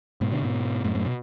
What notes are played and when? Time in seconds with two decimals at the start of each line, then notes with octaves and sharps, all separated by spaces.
0.21 G#2 B2
0.32 B2 D3
0.43 G#2 B2
0.84 F#2 A2
0.95 F#2 A2
1.06 B2